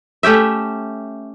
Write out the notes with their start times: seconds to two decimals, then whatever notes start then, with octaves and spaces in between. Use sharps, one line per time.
0.23 A3 C#4 G4 E5